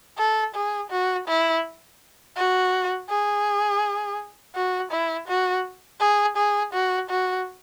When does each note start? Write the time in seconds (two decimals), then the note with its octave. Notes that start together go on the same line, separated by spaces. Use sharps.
0.18 A4
0.55 G#4
0.91 F#4
1.28 E4
2.36 F#4
3.10 G#4
4.55 F#4
4.91 E4
5.28 F#4
6.00 G#4
6.37 G#4
6.73 F#4
7.10 F#4